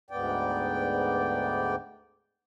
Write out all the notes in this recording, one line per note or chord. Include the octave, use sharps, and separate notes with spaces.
D2 G#2 B3 D5 G5